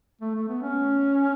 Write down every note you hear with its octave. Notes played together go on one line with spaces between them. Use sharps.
A3
A3
B3
C#4